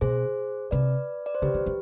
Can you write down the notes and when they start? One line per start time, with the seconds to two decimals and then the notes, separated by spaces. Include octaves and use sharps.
0.01 B2 G#4 C5
0.71 C3 B4 D5
1.26 D5
1.35 C5
1.42 D3 G4 B4
1.54 D#3
1.66 F3